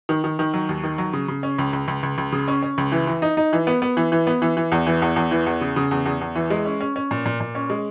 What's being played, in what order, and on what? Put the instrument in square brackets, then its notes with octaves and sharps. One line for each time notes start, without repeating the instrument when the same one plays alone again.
[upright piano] D#3
D#3
D#3
F#3
D#2
D#3
F#3
C#3
C#3
C#4
C#2
C#2
C#2
C#2
C#2
C#3
C#4
C#4
C#2
E3
E3
D#4
D#4
E3
B3
B3
E3
E3
B3
E3
E3
E2
E3
E2
E2
E3
E2
C#3
C#3
E2
E2
E2
E3
G#3
C#4
C#4
C#4
A#2
A#2
A#2
C#4
G#3